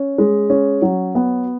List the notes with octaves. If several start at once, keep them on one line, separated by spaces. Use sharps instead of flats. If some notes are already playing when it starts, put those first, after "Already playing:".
Already playing: C#4
G#3
C#4
F#3
B3